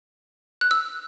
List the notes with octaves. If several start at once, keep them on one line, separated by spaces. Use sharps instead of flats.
F#6
E6